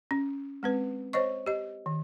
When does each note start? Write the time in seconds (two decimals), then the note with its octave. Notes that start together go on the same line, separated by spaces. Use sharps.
0.11 C#4
0.63 G#3 C4 B4
1.13 C5 C#5 D#5 C#6
1.46 G4 D#5
1.86 D#3